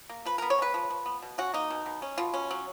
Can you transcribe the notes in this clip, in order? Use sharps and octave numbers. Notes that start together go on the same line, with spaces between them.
A#3
F3 B4
B3 A#4
C#5
G#3 B4
F3
F3
B3
B2
C#4 F#4
A#3 D#4
B2
B2
C#4
B2 F4
C#4
F#3